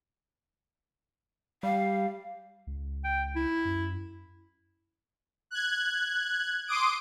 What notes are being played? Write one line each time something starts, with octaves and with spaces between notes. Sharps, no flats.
G3 F5
C#2
G5
E4
F#2
F#6 G#6
C6 D6 D#6 D7